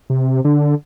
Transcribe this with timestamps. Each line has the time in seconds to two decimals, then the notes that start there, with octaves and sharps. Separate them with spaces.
0.10 C3
0.45 D3